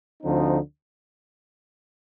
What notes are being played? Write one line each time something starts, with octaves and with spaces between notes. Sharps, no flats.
D2 D3 F3 C4 D#4